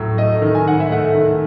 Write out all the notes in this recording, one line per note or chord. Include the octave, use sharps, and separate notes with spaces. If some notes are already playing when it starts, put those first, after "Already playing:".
Already playing: A2 F#3
A3 D#5
D#3
G#5
G#2 F#5
E5
A3 F#5
D#3